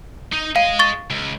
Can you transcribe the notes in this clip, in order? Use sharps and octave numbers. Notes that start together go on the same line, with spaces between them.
D#4
G#4 D#5 F5
C#6 A6
C#2